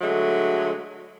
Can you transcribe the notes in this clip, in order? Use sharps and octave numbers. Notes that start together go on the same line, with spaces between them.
D3 F#3 G#3 A3